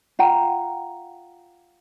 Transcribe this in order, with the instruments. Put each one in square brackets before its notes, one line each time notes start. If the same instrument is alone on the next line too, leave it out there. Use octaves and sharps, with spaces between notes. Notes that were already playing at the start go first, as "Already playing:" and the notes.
[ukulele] F4 F#5 G5 A#5